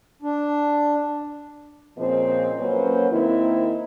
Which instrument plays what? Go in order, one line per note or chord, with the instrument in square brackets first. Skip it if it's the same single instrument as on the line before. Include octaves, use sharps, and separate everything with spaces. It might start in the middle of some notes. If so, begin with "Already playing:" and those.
[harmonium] D4
[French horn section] A#2 C#3 F3 C4 D#5
F#3 A#3 C#4 B4 C5
D#3 A#3 C4 E4